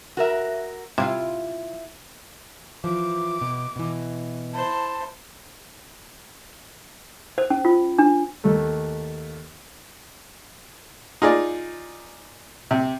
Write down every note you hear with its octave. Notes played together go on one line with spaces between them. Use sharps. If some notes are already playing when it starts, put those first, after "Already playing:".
F#4 A#4 E5
C3 E4 F4
E3 F3 D6
B2
B2 E3
E4 C5 A5
C5
C#4
F4
D4
D#2 A3
D#4 F4 G#4 D5
C3